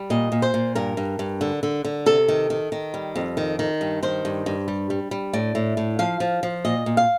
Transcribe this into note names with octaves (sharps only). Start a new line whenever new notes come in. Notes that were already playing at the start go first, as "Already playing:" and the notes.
Already playing: G3
A#2 D#5
A#2
C5
A#2
G2 A#4
G2
G2
D3
D3
D3
C3 A4
D#3
D#3
D#3
G3
F2
D#3
D#3
G2
D#3 C5
G2
G2
G3
G3
G3
A2 D5
A2
A2
F3 F5
F3
F3
A#2 D#5
A#2
F5